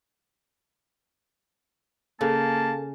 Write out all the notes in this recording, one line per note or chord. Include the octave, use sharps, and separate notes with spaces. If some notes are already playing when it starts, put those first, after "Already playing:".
C#3 A#3 A4 A5